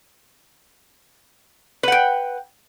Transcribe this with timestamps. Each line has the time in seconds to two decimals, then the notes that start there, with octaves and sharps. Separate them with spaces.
1.83 B4
1.88 F#5
1.92 G5